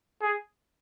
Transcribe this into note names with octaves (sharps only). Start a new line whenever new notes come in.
G#4